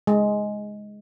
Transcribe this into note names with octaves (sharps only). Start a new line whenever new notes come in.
G#3